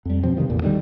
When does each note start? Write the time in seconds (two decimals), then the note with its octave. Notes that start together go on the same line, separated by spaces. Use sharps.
0.05 F2 G3
0.23 B2 F3 C4
0.37 G2 C3 D#3 F3
0.50 A1 E2 A#2
0.62 D3 D#3 F#3 G3